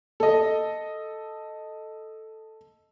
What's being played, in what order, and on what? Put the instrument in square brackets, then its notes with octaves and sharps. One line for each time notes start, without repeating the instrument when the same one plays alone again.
[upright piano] A4 D#5